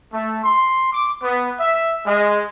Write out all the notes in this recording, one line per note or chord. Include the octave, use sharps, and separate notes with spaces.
A3
C6
D6
B3
E5
G#3